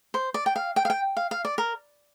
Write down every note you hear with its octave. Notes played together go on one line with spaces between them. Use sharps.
C5
D5
G5
F5
G5
F5
G5
F5
F5
D5
A#4